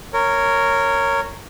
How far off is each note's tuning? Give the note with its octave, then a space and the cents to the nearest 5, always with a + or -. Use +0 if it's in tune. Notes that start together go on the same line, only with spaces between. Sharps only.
A#4 -15 C#5 +0